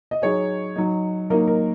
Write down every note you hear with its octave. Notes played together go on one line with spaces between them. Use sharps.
D#5
F#3 D#4 G#4 C#5
F#3 D#4
F#3 A#3 D#4 A#4 D#5
A#4